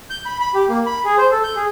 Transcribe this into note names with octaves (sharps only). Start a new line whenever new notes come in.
G6
B5
B5
G4
A#3
B5
G#4
C5
A4
G6
G#4